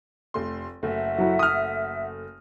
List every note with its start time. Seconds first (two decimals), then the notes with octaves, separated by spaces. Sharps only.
0.34 F1 A3 C6
0.83 F#1 A3 E5 F#5
1.18 F#3 E4
1.39 D#6 F6